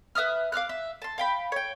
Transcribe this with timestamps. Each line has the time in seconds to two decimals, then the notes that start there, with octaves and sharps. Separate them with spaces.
0.15 B4 E5 D#6 F6
0.52 F5 D6 F6 F#6
0.69 E5
1.02 A5 C6
1.18 F5 G5 B5
1.52 C#5 G5